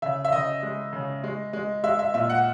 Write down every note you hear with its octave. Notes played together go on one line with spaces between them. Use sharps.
C#3 E5
E5
C#3 D#5
G#3
C#3
G#3
G#3
G#3 E5
E5
A#2 E5
F#5